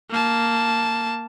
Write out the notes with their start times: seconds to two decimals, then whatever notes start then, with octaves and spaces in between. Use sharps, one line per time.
0.10 A#3 A5